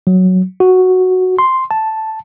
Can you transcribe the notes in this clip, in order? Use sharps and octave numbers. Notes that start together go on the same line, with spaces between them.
F#3
F#4
C6
A5